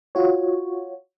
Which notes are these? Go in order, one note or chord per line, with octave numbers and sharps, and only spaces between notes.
F4 F#4 C#5